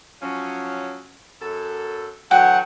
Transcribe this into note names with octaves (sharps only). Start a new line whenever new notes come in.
F3 F#3 C#4
F#2 A4
D3 E3 F#3 F#5 G5